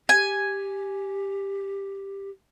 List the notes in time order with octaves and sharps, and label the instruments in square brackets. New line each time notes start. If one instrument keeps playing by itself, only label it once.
[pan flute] G4 [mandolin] G#5